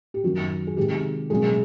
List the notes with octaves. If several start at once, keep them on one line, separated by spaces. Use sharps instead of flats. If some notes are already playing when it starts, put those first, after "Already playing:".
G4
F#2 D#3 F#3 F#4
G#4
C3 D#3 G#3 C4 G4
B2 F#3 G#3 A#3 C#4 G#4